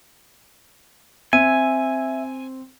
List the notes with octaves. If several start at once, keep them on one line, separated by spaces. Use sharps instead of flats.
C4 E5 G#5 D#7